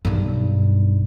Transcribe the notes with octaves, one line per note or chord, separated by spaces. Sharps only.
B1 G2